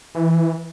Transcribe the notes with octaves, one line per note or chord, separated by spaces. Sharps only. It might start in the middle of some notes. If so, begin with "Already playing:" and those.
E3